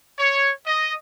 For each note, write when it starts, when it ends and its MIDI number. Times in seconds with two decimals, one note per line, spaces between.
0.19 0.51 73
0.67 0.93 75